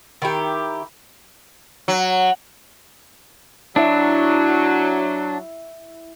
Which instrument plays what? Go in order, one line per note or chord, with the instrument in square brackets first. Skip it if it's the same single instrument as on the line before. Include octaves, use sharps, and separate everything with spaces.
[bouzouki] D#3 E4 G4
[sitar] F#3
[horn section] F#3 [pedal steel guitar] D4 [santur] E4 E5